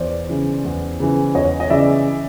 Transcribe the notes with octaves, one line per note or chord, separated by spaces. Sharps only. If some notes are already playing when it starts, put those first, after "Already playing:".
Already playing: E2 C5 D5
C#3 E3
E2
C#3 E3
E2 C#5 D#5
D#5
C#3 E3 D5 E5